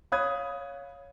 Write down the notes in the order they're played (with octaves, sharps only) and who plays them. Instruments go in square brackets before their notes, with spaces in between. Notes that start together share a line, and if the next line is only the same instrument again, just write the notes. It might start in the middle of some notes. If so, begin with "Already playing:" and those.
[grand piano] C#5 F5 B5 D#6 F#6 G#6